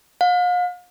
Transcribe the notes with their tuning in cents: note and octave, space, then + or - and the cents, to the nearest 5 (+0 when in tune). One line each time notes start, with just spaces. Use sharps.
F5 +40